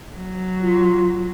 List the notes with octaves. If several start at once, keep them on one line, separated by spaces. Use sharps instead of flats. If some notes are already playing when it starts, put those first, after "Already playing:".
F#3
F4